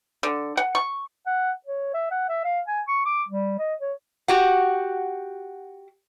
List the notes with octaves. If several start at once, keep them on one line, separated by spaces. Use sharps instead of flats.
D3
F#5
C#6
F#5
C#5
E5
F#5
E5
F5
G#5
C#6
D6
G3
D#5
C#5
F#4 G4 F#5